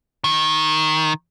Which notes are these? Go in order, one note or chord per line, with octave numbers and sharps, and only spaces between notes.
D#3